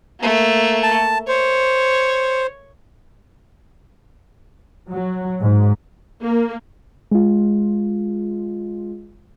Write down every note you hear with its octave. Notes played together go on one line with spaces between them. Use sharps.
A3 A#3
A5
C5 C#5
F#3
G#2
A#3
G#3 F4